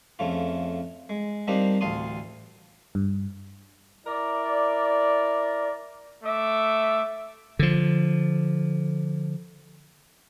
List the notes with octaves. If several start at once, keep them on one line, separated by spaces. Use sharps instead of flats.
F2 C#3 A3 F4
G#3
G3 A#3 C4 D4 D#4 G4
A1 D2 F5 A5 C6 D#6
G2
E4 A#4 D5
A3 E5 D6
D3 F3